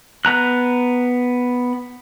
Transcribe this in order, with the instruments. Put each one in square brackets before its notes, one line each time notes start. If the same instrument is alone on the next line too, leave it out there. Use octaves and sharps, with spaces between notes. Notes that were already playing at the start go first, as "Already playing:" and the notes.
[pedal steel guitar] B3 A#5 F#6